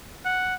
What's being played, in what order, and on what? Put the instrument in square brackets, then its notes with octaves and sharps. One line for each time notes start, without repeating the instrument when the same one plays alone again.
[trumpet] F#5